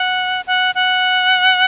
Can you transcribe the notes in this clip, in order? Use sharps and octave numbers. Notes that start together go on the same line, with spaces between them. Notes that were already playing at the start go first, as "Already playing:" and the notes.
Already playing: F#5
F#5
F#5